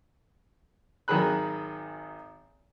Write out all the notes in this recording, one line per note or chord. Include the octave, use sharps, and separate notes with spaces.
G#1 D#3 F#3 G#4 B5 F#6